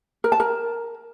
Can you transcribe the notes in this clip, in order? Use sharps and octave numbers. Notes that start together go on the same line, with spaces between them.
A#4
A5
A#4